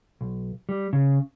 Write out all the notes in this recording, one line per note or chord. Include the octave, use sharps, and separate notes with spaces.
B1
G3
C#3